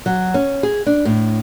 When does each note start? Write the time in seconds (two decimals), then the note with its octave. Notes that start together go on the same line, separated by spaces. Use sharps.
0.06 F#3
0.34 C#4
0.63 G#4
0.86 D4
1.05 A2